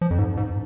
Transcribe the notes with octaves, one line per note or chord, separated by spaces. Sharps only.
F3
F2
G#2
G#2